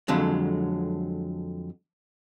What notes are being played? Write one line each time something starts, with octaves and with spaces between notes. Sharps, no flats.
F2 D3 F#3 G#3